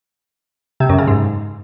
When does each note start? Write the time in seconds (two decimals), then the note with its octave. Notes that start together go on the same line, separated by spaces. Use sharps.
0.80 C3
0.89 F#2
0.98 C#3
1.08 G#2